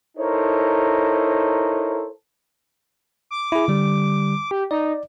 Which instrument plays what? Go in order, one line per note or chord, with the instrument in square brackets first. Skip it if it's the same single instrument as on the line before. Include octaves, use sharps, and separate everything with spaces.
[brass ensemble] D#4 E4 A4 A#4 C5 C#5
[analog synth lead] D6
[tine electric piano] E4 G#4
D3 G3
[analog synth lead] G4
[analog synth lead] D#4 [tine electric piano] D5